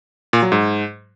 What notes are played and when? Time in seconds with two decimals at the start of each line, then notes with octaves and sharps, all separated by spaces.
0.33 A#2
0.42 F#3
0.52 G#2